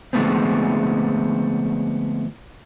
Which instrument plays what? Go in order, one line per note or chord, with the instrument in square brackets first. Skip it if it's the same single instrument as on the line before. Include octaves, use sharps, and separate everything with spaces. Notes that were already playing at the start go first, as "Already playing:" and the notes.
[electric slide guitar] D3 F3 G#3 A3 B3 C4